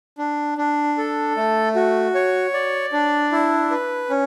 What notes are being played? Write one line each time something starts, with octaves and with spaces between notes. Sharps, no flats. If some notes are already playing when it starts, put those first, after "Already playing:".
D4
D4
A4
A3
F#4
C#5
D5
D4
E4
B4
C#4